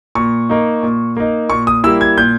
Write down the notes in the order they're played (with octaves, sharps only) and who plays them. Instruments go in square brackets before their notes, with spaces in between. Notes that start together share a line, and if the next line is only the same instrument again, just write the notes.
[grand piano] A#2 C#6
A#3 D#4
A#2
A#3 D#4
A#2 C#6
D#6
G3 A#3 E4 E6
G#6
A#2 G6